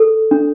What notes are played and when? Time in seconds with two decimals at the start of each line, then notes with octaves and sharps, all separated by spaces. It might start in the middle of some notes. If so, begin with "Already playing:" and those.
Already playing: A4
0.31 D4